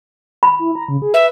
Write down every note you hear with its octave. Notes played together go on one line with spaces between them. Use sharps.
B5
E4
A#5
C#3
G#4
B4 E5